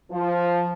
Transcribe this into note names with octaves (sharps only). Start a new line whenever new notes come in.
F3